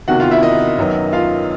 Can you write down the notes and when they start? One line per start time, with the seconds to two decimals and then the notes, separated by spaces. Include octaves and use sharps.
0.08 E2 C3 D#3 F#4 F#5
0.20 F4 F5
0.31 E4 E5
0.43 D#4 D#5
0.78 F#2 D#3 F#3 B3
1.12 F4 F5